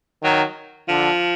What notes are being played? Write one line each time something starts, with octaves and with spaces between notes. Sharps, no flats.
D#3 F#3
D3 F3